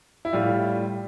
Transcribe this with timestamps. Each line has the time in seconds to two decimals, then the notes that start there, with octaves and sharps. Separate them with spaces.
0.25 E4
0.33 A2 G3 F4